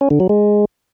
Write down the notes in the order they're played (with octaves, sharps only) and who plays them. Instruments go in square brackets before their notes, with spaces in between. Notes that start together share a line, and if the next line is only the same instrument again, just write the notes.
[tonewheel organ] C#4
D3
F#3
G#3